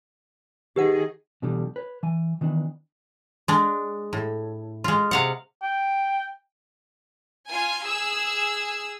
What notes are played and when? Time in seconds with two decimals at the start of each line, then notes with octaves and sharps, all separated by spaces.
0.76 D#3 G4 G#4 B4 F#5
1.42 B2 D3 E3 G3
1.76 B4 C#5
2.03 E3 G#5
2.41 D#3 E3 B3 D4
3.48 G#3 D4
4.13 A2
4.84 G#3 F4
5.11 C3 F5 F#5
5.62 G5
7.50 F4 G#5
7.86 G#4 E6